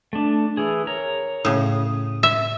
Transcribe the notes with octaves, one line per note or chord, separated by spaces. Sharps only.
A3 D4
E3 G#4
A#4 C#5 A#5
A2 C#3 D#6
E5